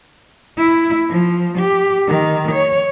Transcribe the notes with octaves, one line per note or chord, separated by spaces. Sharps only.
E4
F3
G4
D#3
C#5